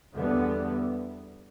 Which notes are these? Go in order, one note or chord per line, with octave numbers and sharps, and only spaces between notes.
E2 D3 G3 B3